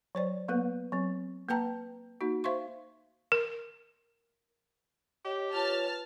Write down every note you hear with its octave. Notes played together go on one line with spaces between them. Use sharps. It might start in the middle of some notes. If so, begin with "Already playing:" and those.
F#3 C5 D5
F#3 A#3 B3 B4
F#3 C4
A#3 B4 G5 A5 A#5
A#3 D#4 F#4
C5 E5 F5 C6 C#6
A#4
G4 C#5 D#5
F4 B4 C#5 A5 F6